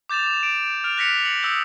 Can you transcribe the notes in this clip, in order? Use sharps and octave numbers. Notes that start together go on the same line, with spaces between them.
D6 G6 A6 E7 F7
D7
F6 D7 F7
F#6 A#6 B6 C#7 F7
C#7 F#7
D#6 E6 G6